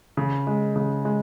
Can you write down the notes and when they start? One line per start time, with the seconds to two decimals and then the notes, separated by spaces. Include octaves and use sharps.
0.17 C#3
0.47 G#3
0.76 C#3
1.05 G#3